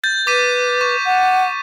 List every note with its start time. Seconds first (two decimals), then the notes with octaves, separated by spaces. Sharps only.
0.04 G6 A6
0.27 B4 D6 B6 D#7
0.81 C#6
1.05 F#5